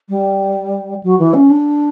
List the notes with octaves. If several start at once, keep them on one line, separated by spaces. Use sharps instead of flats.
G3
F#3
E3
C#4
D4